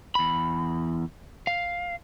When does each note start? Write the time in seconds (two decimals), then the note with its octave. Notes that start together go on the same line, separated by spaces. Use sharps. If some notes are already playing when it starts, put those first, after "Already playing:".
0.15 E2 B5
1.47 F5